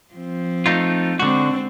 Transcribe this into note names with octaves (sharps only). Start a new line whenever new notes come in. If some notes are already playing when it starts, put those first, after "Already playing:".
F3 C4
A3 D#4 F4
D3 G#3 C4 F#4